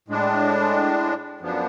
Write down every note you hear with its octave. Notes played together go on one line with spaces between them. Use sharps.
A2 G#3 D4
F#2 F3 B3 D4